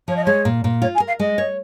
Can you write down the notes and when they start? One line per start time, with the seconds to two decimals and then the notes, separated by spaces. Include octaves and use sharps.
0.08 F3 C#5
0.16 D#5
0.24 G#3 C#5
0.45 A#2
0.64 A#2
0.82 F4 C#5
0.94 G#5
1.00 A#4
1.07 F5
1.20 G#3 D#5
1.38 C#5